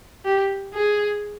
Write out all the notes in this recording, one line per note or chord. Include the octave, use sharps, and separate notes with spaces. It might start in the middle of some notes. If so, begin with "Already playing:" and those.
G4
G#4